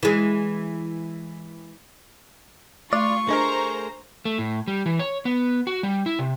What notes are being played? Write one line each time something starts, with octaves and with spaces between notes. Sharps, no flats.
E3 G#3
A3 F4 D5 C#6
A3 D4 G#4 A#4 C5 D#5 A#5
A3
A2
G3
E3
C#5
B3
F#4
G3
E4
C3